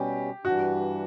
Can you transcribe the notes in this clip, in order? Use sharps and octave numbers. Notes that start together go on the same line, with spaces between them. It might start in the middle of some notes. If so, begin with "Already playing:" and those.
Already playing: B2 G3 C#4 G4
G2 E3 G3 D4 F#4